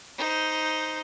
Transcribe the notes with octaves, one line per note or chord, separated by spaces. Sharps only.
D#4 C5